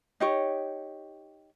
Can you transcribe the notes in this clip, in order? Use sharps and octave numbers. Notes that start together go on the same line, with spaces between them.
D#4 G4 C#5